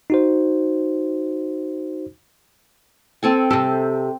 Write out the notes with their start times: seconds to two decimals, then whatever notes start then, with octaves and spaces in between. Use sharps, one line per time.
0.10 D#4 F#4 C5
3.23 C4 A4 G#5
3.51 C3 G4 A4